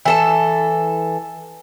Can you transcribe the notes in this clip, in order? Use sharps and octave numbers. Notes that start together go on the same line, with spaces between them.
E3 A4 A5